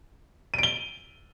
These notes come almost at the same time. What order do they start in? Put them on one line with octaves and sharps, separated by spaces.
D#7 D7 G7